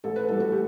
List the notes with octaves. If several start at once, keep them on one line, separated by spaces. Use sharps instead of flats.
A1 A4
B4
A2 E3 G3 A4
F#4
G4